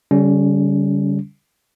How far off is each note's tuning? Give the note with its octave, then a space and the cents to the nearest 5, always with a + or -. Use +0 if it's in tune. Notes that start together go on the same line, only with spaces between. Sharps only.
D3 -40 G3 +0 C#4 +20